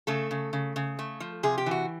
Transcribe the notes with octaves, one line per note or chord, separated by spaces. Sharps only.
C#3 A3 A4
C#3
C#3
C#3
A3
F3
C3 G#4
G4
E3 F#4